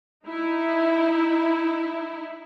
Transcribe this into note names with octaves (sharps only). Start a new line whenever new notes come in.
D#4 E4